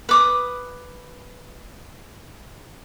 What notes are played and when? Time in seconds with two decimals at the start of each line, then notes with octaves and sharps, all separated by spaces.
0.09 B4 D6 D#6